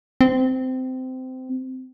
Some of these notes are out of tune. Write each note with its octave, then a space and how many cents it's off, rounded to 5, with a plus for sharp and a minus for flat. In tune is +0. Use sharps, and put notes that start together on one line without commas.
C4 -20